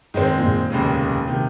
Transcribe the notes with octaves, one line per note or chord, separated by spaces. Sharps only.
G#2 D#3 G#3 C4
A#2
G#2
F1 D#2 C#3 G#3
C3 D#3